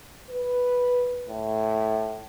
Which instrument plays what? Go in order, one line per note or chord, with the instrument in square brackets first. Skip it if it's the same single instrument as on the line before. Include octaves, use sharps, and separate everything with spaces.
[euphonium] B4
A2